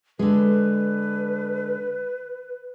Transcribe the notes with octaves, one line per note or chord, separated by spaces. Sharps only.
D3 G#3 B4